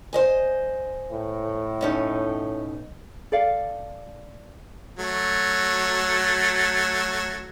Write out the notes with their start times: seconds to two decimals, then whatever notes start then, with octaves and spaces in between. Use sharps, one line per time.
0.13 C5 D#5 G#5
1.11 A2
1.81 B2 C#4 D#4
3.32 A4 D5 F5
4.98 F#3 A3